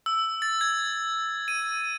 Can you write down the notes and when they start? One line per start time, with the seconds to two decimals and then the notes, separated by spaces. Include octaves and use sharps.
0.06 E6
0.42 A6
0.61 G#6
1.48 D#7